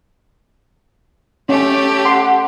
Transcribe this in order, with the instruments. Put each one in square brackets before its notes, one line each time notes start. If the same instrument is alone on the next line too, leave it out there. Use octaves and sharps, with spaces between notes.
[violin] A3 G4 [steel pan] C#4
[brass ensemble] F#5 [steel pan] C6